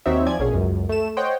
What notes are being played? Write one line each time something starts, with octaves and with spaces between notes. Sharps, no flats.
D#2 C4 D#4 F#4 C#5 E5
F3 D5 G#5 G#6
A#1 B2 C#4 G#4
C#2 F#2
A3 E7
C5 C#5 D#5 F#5 G5 C6